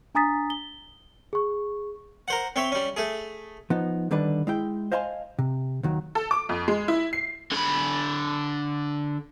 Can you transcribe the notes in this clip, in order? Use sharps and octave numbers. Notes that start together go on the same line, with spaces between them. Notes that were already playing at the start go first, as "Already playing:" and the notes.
D4 G#5 A#5 D#6 A6 B6
G7
G#4 C#6
A#4 C5 F#5
C4 C#5 E5 C6
G3 C#4
A3 G#4
F3 B3 D#4
D3 D#3 G3 D4 B4
G#3 E4 G5
C5 D#5 F5 G#5 A5 C6
C3
D#2 D#3 F#3
A4
D6
F2
G#3
E4
C7
D3 B5